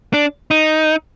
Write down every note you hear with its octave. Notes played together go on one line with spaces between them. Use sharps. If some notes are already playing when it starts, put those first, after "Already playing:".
D4
D#4